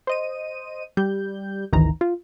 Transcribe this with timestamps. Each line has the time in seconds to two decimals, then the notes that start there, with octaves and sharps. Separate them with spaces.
0.07 C5 D#5 D#7
0.97 G3 G6
1.73 G#1 D2 D#3 E3 A#5
2.01 F4